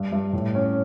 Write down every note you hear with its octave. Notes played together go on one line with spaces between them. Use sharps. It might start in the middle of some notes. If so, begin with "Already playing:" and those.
Already playing: G2
G2
A2
C#4